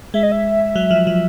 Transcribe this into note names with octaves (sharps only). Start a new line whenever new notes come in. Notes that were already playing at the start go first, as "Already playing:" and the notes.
G#3 E5
D#5
E5
F#3
F3
F3